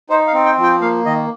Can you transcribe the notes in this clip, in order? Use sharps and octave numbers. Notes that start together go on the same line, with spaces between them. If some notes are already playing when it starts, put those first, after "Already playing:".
D#4 C5
F5
C4
G5
F3
G5
A#3 F5
D#3 D#5